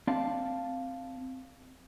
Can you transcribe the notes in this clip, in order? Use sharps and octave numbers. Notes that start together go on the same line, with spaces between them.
C4 D5 F5 A5